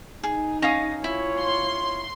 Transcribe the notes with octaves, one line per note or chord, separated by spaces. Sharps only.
D#4 G#4
C#4 D#5 F5 D#6
E4 F4 C#5
C6